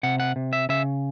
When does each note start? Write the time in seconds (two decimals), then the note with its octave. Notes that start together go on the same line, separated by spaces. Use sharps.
0.03 C3 F#5
0.20 F#5
0.36 C3
0.53 E5
0.69 C#3 E5